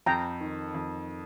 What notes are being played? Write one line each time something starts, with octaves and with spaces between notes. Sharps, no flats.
F2 G5 A#5
D#3
F2